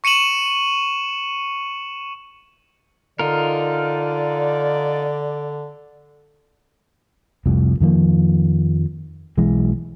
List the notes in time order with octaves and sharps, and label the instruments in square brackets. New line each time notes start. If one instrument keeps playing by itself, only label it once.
[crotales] C#6 C#7 D#7 E7 F#7
[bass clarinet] D3 [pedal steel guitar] D#4 F4 A#4 [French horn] D5
[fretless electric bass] F1 C2 F2
F2 D#3 F3 A#3
B1 E3 G#3